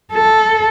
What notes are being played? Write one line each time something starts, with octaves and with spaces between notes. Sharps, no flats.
A4